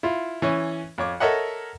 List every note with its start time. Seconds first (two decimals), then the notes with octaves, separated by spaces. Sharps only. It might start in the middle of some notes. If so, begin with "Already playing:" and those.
0.03 E4 F4
0.42 E3 C#4 C#5
0.98 F2 C#5 D6
1.20 A4 A#4 C#5 D#5 E5 F#5